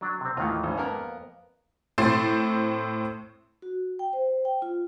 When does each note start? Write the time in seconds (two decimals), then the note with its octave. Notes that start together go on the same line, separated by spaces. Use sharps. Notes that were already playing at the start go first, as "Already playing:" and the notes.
0.01 F#3 D4 D5
0.21 C3 C4
0.37 D#2 A2 D#3 E3 F4
0.63 G#1 C#4
0.78 F2 A#3 B3 A#4
1.98 A2 C4 C5 C6 A6
3.62 F#4
3.99 G5
4.13 C5
4.45 G5
4.62 F4